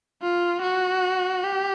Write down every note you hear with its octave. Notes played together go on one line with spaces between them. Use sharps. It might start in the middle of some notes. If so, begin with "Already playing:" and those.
F4
F#4
G4